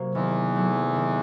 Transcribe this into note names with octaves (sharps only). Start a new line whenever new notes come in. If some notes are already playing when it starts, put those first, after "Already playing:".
Already playing: C3 F#3 A#3
E2 D#3 E3
F#3 A3
D#3